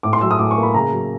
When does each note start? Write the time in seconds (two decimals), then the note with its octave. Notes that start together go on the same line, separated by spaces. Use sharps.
0.03 A2 D6
0.13 C6
0.21 F#3 E6
0.31 D#6
0.39 A2 D6
0.51 C#6
0.57 A#3
0.63 B5
0.74 C#3 A#5
0.92 F#3